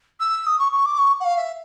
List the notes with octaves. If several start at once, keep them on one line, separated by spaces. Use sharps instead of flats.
E6
D#6
C#6
C#6
D6
C#6
F#5
F5
E5